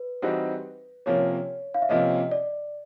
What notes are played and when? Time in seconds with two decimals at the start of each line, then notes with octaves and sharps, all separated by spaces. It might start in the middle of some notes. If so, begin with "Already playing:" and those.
Already playing: B4
0.22 E3 G3 C4 D#4 F#4
1.06 C3 F3 A#3 C#4 C#5
1.74 F5
1.82 E5
1.89 C3 F3 A#3 C#4 D#5
2.31 D5